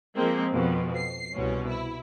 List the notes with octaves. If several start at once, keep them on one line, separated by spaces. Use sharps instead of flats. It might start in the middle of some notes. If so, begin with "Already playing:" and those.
F3 G#3 A#3 C4
F2 B2
C7
C2 B2 C#4
E4